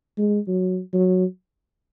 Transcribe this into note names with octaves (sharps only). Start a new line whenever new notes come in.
G#3
F#3
F#3